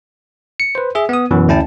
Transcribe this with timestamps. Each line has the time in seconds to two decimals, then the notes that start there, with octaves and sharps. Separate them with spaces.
0.60 C#7
0.75 B4 C5
0.95 G#4 E5
1.09 B3 D#6
1.31 F#2 B2 E3
1.48 D2 C#4 E4 G5 A5